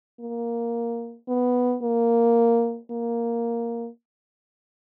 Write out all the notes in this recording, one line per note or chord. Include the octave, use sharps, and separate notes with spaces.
A#3
B3
A#3
A#3